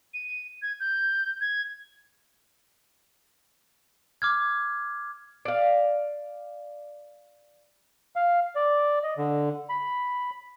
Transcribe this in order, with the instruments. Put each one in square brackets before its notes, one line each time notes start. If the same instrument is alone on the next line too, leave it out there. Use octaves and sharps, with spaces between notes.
[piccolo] D#7
G#6
G6
G#6
[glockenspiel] D6 F6 G#6
[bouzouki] D5 F5
[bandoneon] F5
D5
D#5
D3
B5